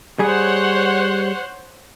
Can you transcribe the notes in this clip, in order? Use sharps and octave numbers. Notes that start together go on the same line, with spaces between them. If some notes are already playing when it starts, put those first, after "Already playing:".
G3 G#4 C5 C#5 F#5